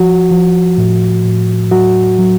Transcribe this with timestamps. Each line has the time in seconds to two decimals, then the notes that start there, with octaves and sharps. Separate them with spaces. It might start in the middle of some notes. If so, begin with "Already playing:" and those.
Already playing: F3 F#4
0.31 F3
0.78 A2
1.25 A2
1.71 F#3 F#4
2.19 F#3